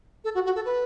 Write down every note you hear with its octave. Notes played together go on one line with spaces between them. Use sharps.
A4
F#4
F#4
A4
B4